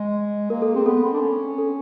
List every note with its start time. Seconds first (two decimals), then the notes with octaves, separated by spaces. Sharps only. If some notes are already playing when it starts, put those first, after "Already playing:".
Already playing: G#3
0.50 A#3 A#4
0.62 A4
0.74 C4 G#4
0.86 B3 A4
1.04 C4
1.13 D4
1.21 C#4
1.58 A4